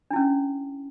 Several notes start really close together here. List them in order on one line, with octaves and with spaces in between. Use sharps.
D4 E4 C#4